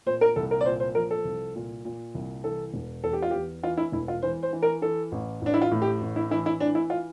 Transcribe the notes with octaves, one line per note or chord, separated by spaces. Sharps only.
A#2 C5
A#4
C2 A4
A#4
D5
A#2 C5
C5
F3 A#4
A4
C2
A#2
A#2
C2
E3 A4
E1
E2 A4
G4
F4
E2 G4
E3 F4
E4
E1 E4
F4
E3 C5
C5
E3
A#4
E3 A4
A1
A1 D4
E4
F4
A2
G4
A1
E4
E3 E4
E4
E3 D4
E4
F4